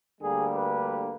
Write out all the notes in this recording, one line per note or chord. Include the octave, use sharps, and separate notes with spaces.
D2 D3 G3 A#3 G#4
B4